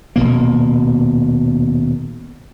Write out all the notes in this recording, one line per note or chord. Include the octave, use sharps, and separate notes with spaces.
D#1 F2 B2 A#3